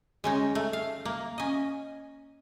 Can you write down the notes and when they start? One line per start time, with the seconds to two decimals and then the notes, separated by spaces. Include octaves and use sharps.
0.24 G#3 C#4 D#4
0.55 A3
0.73 F5
1.05 A#3
1.38 C#4 D#5